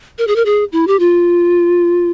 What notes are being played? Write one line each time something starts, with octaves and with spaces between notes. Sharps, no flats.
A#4
G#4
A#4
G#4
E4
G4
F4